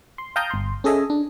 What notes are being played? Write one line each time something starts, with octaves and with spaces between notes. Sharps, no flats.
C6
F5 G5 A5 A#5 D#6 G6
G1 C6
C#4 G#4 A4 D#5 E5 G#5
D4